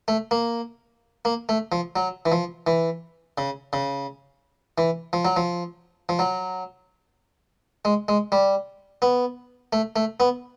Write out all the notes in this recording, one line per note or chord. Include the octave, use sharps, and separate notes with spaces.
A3
A#3
A#3
A3
F3
F#3
E3
F3
E3
C#3
C#3
E3
F3
F#3
F3
F3
F#3
G#3
G#3
G3
B3
A3
A3
B3